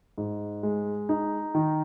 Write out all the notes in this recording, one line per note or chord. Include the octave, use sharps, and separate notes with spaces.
G#2
G#3
D#4
D#3